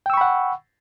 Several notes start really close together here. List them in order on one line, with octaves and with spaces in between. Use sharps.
G5 E6 C#6 B5 F#5